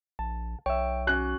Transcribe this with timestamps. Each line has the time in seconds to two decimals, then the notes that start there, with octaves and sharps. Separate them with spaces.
0.19 A#1 A5
0.66 B1 C#5 E5 G5
1.07 C#4 F#4 F#6